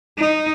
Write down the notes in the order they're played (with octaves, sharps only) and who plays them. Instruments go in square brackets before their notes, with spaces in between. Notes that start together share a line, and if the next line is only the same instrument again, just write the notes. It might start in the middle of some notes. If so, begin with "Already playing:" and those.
[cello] D#4